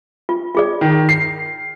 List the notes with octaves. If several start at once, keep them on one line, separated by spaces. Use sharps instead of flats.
F4
F4 G#4 D5
D#3
C7